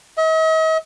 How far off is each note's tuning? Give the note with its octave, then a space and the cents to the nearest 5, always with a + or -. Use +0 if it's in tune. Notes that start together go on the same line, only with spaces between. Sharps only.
D#5 +45